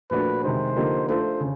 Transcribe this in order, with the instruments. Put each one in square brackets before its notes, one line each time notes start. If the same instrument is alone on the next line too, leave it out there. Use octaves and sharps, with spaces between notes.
[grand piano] A#2 F3 A3 D4 F#4 [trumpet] B4
[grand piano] C3 D#3 G#3 [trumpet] C5
[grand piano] D3 F3 A#3 D#4 G4
[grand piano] A3 D4 F4 A4 [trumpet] C5
[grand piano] C#3